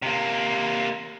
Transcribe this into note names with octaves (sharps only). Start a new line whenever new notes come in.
C3 A#3